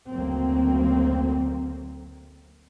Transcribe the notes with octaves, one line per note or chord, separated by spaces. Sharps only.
F#1 D2 F#3 A#3 C4